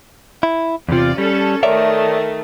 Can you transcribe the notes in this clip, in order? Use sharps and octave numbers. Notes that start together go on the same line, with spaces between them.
E4
E2 C3 F4 D5
G3 C#4 A4
D#3 A3 C#5 D5 E5